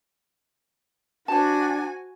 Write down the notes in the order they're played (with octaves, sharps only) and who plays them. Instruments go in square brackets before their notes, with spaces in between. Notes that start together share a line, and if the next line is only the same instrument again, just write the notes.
[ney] D4 [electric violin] F#4 G#5 [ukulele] C5 A5